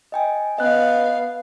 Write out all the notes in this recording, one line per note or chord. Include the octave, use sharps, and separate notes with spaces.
D#5 G5 G#5
B3 D#5 F5 F#6